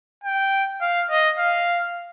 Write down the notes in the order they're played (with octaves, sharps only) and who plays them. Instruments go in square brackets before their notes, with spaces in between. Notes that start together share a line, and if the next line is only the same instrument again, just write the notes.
[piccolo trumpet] G5
F5
D#5
F5